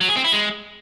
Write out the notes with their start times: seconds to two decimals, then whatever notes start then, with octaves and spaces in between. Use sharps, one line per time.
0.01 F#3
0.09 G#4
0.16 C4
0.24 E4
0.32 G#3